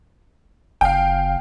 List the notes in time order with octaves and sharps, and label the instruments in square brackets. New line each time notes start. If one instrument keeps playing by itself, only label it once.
[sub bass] F#1 [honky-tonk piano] F5 G5